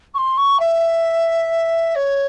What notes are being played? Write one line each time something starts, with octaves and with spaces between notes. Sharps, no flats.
C#6
C6
C#6
E5
C#5